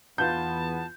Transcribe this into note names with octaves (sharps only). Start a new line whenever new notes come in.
E2 B3 F4 B4 F#5 A5 G6